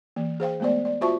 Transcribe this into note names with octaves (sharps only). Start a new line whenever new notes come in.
E3 A#3
G#4 C5 F5 G5
G#3 A3 B3 C5 D5
D5
F4 F#4 C5 E5 A5 C#6